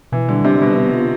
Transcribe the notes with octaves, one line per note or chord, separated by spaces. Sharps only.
B2 E3
D3 G3
C3 D4
B2 G3
B3
F4